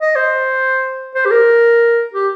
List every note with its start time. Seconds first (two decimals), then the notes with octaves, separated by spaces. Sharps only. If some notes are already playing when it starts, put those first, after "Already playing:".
0.02 D#5
0.16 C5
1.15 C5
1.26 G4
1.31 A#4
2.14 G4